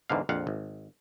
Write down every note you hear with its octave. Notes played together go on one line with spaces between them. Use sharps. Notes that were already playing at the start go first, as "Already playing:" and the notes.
E2 G#2 D3 F5
A#1 F2 F5 F#5
G#1